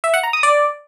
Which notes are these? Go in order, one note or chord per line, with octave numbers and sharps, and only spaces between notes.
E5
F#5
A#5
D#6
D5